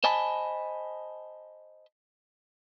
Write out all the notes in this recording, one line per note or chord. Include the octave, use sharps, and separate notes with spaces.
C5 D#5 G#5 A5 B5